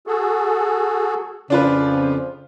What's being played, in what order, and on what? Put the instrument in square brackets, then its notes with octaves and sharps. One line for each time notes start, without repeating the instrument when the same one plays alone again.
[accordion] F#4 G#4 A4
[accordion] F2 F3 [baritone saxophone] C#3 [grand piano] D4 F4 B4